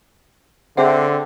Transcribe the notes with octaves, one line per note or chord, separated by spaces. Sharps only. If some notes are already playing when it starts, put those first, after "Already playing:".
D3 C4 G#4 E5 F#5